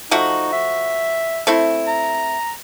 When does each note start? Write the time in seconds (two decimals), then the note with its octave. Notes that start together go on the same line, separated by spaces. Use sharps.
0.11 F3 A3 D#4 F#4
0.53 E5
1.47 A3 C4 E4
1.87 A#5